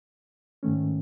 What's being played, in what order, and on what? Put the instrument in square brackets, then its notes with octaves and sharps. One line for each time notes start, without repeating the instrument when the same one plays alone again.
[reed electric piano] G#2 D#3 A3 C#4